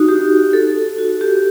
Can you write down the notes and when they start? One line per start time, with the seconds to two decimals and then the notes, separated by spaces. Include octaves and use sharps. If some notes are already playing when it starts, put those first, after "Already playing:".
Already playing: D#4 F#4
0.09 G4
0.53 A4
0.99 F#4
1.21 G4